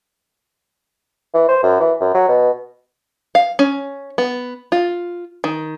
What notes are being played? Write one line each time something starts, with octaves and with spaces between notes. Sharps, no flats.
E3
C5
F#2
E3
F#2
F#3
B2
F5
C#4
B3
F4
D#3